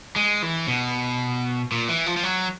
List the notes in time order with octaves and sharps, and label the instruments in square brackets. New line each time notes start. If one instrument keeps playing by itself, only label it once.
[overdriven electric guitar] G#3
E3
B2
A#2
E3
F3
F3
F#3